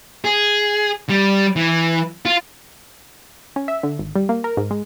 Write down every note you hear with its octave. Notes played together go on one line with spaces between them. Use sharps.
G#4
G3
E3
F4
C#4
E5
D3
G#1
G3
A#3
A#4
G#2
G#3